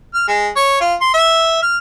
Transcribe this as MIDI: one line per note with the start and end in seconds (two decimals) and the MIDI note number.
0.14 0.23 89
0.28 0.48 56
0.56 0.77 73
0.81 0.94 65
1.01 1.10 84
1.14 1.58 76
1.62 1.77 89